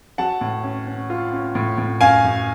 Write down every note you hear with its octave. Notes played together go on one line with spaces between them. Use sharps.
F#3 F#5 A5
A2
C#4
C#4
F4
C#4
A2
A2
F#2 F5 G#5
F#2